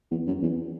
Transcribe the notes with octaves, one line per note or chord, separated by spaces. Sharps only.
E2
F#2
E2